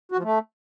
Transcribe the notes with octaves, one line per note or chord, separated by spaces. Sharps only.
F#4
F3
A3